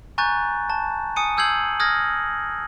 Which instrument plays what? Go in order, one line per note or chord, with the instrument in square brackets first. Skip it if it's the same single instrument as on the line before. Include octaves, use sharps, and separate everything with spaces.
[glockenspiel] G#5 A#5 C#6 F#6 G6 A6
A5
G#5 D#6 C#7 D#7
D#6 E6 G6 G#6 C7 F#7
D#6 F6 G#6 A#6